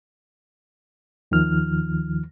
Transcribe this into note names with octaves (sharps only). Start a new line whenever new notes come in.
D#2 D#3 F3 F6